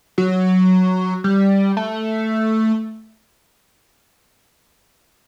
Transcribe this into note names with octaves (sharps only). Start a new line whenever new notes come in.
F#3
G3
A3